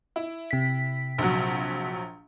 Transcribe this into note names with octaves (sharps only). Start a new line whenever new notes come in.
E4
C3 B6
A#1 F#3